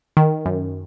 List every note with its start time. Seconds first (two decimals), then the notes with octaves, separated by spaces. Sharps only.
0.17 D#3
0.46 F#2